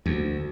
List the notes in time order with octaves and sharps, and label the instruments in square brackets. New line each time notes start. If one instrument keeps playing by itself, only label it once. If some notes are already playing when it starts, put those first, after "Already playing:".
[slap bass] D2